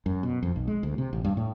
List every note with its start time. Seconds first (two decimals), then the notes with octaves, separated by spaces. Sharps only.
0.06 F#2
0.23 B2
0.43 F2
0.56 B1
0.68 G#3
0.83 D2
0.98 C3
1.13 A1
1.24 G2
1.37 A2